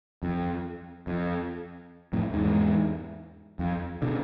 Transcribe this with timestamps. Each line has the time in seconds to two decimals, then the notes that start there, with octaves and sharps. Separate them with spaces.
0.23 F2
1.07 F2
2.13 F2 A2
2.33 E2 G#2
3.59 F2
4.02 B2 D3